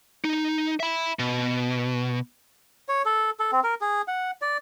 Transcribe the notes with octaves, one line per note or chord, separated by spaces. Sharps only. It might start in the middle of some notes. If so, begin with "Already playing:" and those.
D#4
E5 B5
B2
C#5
A4
A4
C4
A#4
G#4
F#5
D5